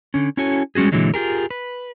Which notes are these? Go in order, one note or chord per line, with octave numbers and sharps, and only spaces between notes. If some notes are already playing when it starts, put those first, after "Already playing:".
D3 C#4
C#4 E4 F#4 A4 C#5 G#5
G3 G#3 C#4 F#4 G#4
A#2 D3 E3 F#3 G#3
F4 G4 G#4 A#4
B4